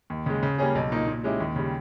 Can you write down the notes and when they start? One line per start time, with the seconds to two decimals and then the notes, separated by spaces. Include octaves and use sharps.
0.10 D#2
0.26 C#3 G#3
0.43 C#3
0.58 G3 A#3 C#4 G#4
0.75 B1
0.91 A#2 A#3 D#4
1.08 A#2
1.24 G#3 C#4 E4 G4
1.40 D#2
1.56 C#3 G3